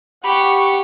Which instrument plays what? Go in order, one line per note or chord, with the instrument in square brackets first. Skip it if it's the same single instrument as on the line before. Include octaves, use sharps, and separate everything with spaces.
[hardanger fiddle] G4 [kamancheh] F#5 C#6 [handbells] B5